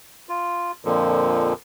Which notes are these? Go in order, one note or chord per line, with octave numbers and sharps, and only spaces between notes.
F4
F2 A#2 D3 F3